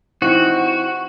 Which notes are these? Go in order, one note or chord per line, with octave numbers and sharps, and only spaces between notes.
E3 C4 D#4 F#4